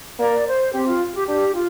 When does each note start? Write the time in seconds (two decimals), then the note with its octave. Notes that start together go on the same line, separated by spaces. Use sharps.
0.19 A#3 D5
0.46 C5
0.73 C4 G4
0.86 F4
1.14 G4
1.27 D4 G4
1.54 F4